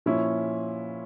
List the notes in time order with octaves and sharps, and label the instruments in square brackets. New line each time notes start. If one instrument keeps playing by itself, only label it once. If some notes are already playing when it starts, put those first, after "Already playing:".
[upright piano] A#2 F3 C#4 E4